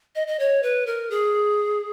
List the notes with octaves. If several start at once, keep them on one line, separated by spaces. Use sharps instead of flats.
D#5
D#5
C#5
B4
A#4
G#4